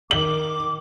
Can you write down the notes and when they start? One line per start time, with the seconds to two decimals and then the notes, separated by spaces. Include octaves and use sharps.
0.11 D#3 D6 F#7